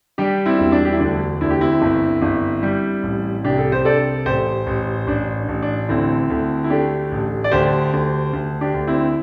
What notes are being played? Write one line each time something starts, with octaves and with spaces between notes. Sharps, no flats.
G3 D4 G4
C4 E4
E1
D4
G4
E4
D2 D4
D2 E4
G4
C4 E4
G1
G1
G3
A1
C2 D4 G4
A4
C5
C2 A4 D5
A1 G4 C5
A1
A1 D4
A1
D4
D2 C4 E4
D2
E4
A3 D4 G4
A1
D5
D2 G4 C5
D2
D2
D4 G4
D2
C4 E4